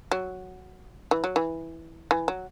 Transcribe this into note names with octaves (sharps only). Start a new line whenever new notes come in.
F#3
E3
F#3
E3
E3
F#3